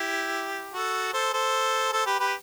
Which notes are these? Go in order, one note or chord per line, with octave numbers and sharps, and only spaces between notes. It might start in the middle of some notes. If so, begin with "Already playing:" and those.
Already playing: E4 G4
F#4 A4
A4 C5
A4 C5
A4 C5
G4 B4
G4 B4